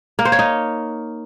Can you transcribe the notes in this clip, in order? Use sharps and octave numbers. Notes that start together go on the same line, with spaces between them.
A#3
C5
C#5
D#4